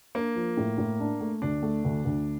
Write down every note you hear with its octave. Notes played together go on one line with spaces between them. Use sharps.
A#3 D4
F3
A2
A2
D4
A3
D2 D4
A3
D2
D2